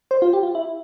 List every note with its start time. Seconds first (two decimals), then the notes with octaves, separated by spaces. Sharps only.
0.11 C5
0.22 F4
0.33 G4
0.43 F4
0.55 E4